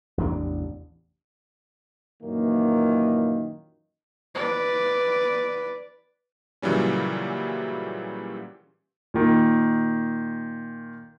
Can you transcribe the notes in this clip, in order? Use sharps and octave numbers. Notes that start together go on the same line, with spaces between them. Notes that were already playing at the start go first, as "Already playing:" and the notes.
A1 E2 C3 D4
F#2 A#2 D#3 E3 A#3
B4 D5
A#2 C#3 E3 F#3 G3 C#4
A#2 D#3